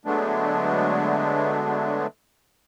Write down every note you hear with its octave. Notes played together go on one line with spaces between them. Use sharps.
D3 F#3 G#3 A3 B3 D4